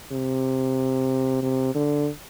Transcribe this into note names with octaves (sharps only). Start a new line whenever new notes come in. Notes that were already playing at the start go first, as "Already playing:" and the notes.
C3
C3
D3